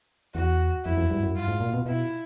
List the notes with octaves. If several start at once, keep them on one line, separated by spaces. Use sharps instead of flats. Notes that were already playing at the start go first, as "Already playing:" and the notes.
E2 F#4
F2 E4
F2
G2
F#2
G2 F4
G#2
A#2
B2
B2 E4